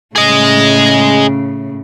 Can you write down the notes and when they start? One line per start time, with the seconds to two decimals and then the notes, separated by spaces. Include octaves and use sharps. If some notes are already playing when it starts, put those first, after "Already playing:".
0.16 A2 C#3 G#4 D#5